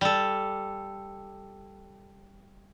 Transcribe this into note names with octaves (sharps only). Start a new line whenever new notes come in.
G3 A4